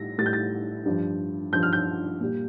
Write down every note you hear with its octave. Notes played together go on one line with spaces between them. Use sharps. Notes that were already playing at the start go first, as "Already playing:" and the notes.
Already playing: A2 G3 A#6
A2 G3 A6
G6
A6
G2 F3
G2 F3 G6
F6
G6
A#2 G3